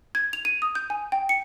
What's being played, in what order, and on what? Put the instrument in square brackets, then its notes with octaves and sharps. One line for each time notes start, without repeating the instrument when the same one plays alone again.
[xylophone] G#6
F7
D#7
D#6
G6
G#5
G5
C#7